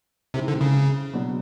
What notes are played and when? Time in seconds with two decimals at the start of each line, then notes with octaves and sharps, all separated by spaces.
0.34 C3 D#3 G#3 C4 E4
0.48 D3
0.61 C#3
1.14 B2 F#3 B3 D4